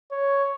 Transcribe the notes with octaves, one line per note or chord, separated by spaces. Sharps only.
C#5